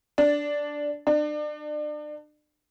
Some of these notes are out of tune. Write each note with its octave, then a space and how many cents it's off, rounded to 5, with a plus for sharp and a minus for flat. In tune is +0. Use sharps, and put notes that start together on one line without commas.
D4 -5
D4 +35